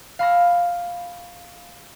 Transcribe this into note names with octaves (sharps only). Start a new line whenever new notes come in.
F5 G#5 B5 C#6 E6 A#6